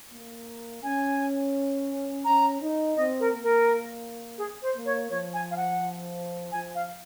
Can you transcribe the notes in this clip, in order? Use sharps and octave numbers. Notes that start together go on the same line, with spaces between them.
A#3
C#4 G#5
C#4 A#5
D#4
C4 D#5
A#4
A#3
A#4
G#4
C5
A#3
C#5
F3 C#5
G#5
F5
F#5
F3 G#5
F5